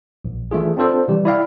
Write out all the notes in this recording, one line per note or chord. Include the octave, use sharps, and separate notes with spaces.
A#1
E3 A3 D4 F4 G#4
C4 D4 F4 A4 C5
C3 E3 G3 G4
E4 D5 F5 G5